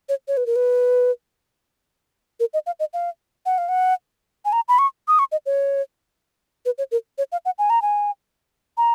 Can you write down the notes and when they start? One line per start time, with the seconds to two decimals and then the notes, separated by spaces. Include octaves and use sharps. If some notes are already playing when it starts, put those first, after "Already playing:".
0.09 C#5
0.28 C#5
0.37 B4
0.46 A#4
0.56 B4
2.40 A#4
2.54 D#5
2.66 F5
2.80 D#5
2.94 F5
3.46 F#5
3.58 F5
3.69 F#5
4.45 G#5
4.53 A#5
4.68 B5
4.79 C#6
5.08 D#6
5.19 C#6
5.32 D#5
5.46 C#5
6.66 B4
6.78 C#5
6.92 A#4
7.18 C#5
7.32 F5
7.45 F#5
7.59 G#5
7.70 A#5
7.82 G#5
8.78 A#5